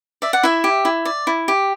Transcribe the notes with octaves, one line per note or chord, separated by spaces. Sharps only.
D5 E5
F#5
E4 E5
G4
E4
D5
E4
G4